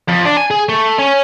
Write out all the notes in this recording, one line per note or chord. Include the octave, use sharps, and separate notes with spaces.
F2
D4
G#5
G#4
A3
C#4